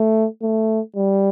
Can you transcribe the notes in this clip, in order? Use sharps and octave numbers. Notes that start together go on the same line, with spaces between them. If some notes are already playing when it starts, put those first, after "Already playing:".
Already playing: A3
A3
G3